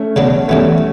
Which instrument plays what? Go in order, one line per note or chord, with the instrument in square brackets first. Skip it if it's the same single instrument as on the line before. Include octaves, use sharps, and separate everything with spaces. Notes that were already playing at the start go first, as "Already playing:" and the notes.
Already playing: [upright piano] A3 C#4
[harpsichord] C#3 F#3 B3 D4
[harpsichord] G2 E3 B3 [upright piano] A3 C#4